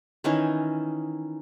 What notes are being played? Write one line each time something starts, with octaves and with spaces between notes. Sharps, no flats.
D#3 E3 C#4 D#4